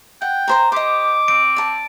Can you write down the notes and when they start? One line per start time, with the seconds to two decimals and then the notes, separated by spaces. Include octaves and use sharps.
0.22 F#5 G5
0.48 A#4 C5 A#5
0.72 G4 C5 D#5 D6
1.28 C4 D7
1.56 D5 A5